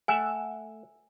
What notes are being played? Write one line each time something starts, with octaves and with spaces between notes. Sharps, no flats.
A3 E5 F#5 G#5